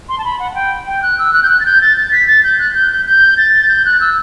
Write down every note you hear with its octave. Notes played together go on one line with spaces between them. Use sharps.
C6
A5
B5
F#5
F#5
G5
G5
F#6
E6
F#6
G6
F#6
A6
G6
A6
A6
B6
A6
G6
F#6
G6
G6
G6
A6
G6
F#6
E6